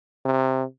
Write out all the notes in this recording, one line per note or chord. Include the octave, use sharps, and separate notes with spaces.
C3